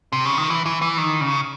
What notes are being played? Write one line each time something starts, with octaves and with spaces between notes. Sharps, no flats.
C3
C#3
D#3
E3
E3
E3
D#3
C#3